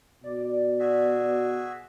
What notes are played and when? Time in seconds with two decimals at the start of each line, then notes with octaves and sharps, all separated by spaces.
0.24 B2 D5
0.80 F#4 G#4 E5